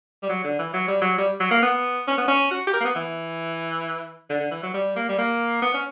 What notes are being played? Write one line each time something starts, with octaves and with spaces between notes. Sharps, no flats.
G3
F#3
D3
E3
F#3
G3
F#3
G3
F#3
A#3
B3
C#4
B3
C#4
F#4
G4
A#4
A#3
B3
E3
D3
D3
E3
F#3
G3
A#3
G3
A#3
B3
C#4